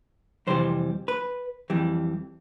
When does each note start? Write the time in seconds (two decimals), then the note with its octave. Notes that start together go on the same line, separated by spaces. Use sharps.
0.47 F2 C3 E3 G3 C5
1.08 B4
1.70 F2 E3 G3